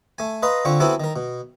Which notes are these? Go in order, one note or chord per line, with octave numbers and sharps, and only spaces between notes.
A3 G#5
B4 D#5 F5 A#5 C6
D3 C4 F4 C#6
B3 C4 E4 F#4 A4 G#5
D#3 A#4
B2